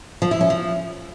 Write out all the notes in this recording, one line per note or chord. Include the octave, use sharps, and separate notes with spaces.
F3
E4
C#4
F3